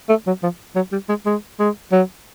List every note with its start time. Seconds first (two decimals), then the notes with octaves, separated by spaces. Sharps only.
0.09 A3
0.27 F#3
0.43 F3
0.76 F#3
0.92 G3
1.09 G#3
1.26 G#3
1.60 G#3
1.92 F#3